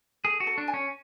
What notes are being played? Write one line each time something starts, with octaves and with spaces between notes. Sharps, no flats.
G#4 A4
F#4
A4
D4
G#5
C#4